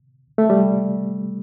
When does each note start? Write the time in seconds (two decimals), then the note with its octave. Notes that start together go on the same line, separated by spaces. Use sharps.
0.38 A3
0.50 G3